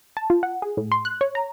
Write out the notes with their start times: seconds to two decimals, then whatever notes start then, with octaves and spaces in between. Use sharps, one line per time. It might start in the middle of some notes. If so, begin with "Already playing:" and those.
0.17 A5
0.30 F4
0.43 F#5
0.62 G#4
0.77 A2
0.92 C6
1.05 F#6
1.21 C#5
1.35 A#5